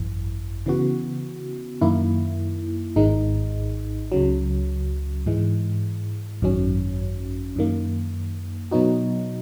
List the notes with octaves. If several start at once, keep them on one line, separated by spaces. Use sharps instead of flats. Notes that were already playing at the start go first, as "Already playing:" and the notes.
Already playing: G#1 F#2 E3
C#3 E3 B3 F#4
F#2 D#3 A#3 E4
G#1 G#2 D#3 G#3 D#4
C#2 C#3 F#3
G#2 E3 G#3
G#1 F#2 D#3 F#3 C#4
F#2 D#3 A#3
B2 F#3 B3 D#4 F#4